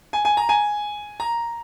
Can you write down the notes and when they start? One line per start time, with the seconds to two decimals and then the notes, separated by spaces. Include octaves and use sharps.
0.13 G#5
0.25 G#5
0.37 A#5
0.49 G#5
1.20 A#5